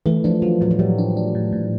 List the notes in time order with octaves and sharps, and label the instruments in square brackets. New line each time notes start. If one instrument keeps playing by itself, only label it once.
[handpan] E3 [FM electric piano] A3
[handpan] F3 [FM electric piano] D4
[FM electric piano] F3 [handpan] F#3
[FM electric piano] A2 [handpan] F#3
[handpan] F#3
[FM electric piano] A2 [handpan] G3
[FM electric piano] D4
D4
A2
A2